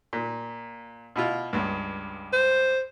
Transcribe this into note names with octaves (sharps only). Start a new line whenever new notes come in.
A#2
B2 E4 F4
C#2 G2
C5